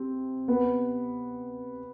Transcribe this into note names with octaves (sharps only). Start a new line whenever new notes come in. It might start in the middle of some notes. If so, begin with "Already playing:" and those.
Already playing: C3 C4
B3